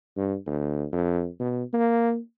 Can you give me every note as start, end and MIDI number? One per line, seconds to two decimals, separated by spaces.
0.17 0.35 43
0.46 0.86 38
0.93 1.27 41
1.40 1.64 47
1.73 2.19 58